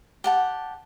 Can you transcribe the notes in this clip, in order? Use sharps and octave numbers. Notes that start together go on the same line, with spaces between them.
G4 F#5 A5